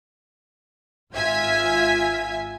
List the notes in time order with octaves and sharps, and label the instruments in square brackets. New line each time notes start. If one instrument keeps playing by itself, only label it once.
[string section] G#1 F4 E5 G#5 G#6 B6